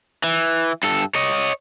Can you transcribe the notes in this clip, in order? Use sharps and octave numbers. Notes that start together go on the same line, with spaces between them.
E3
G2 A4
C#5 D#5